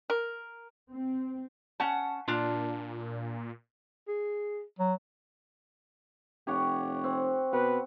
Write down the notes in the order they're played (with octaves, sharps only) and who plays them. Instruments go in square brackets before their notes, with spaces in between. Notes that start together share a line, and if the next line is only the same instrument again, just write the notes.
[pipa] A#4
[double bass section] C4
[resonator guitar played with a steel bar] C#4 F#5 A5
[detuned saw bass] A#2 [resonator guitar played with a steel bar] D4 F4
[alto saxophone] G#4
[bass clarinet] F#3
[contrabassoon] F1 [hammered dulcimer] G4 C#5 F#5
[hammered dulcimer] C4
[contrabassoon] B2 [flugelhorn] B4 [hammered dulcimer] F#5